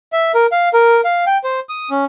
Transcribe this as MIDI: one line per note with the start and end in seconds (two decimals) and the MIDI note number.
0.13 0.32 76
0.34 0.47 70
0.52 0.69 77
0.74 1.01 70
1.05 1.25 77
1.27 1.38 79
1.44 1.60 72
1.69 1.90 87
1.90 2.05 61